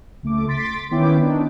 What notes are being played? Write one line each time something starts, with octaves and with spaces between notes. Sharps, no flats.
C#2 A3 D6
C6 A6 B6 D7
D#3 B3 C#4 E4 G5 D6
D4 D#4